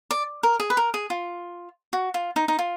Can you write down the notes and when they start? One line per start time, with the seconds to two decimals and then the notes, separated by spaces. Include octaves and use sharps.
0.11 D5
0.43 A#4
0.60 G#4
0.70 B4
0.77 A#4
0.94 G#4
1.10 F4
1.93 F#4
2.14 F4
2.36 D#4
2.48 D#4
2.59 F4